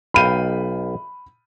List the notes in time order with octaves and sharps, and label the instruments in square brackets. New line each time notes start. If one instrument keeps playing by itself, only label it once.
[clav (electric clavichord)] B1 F5 G5 [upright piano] B5 D#7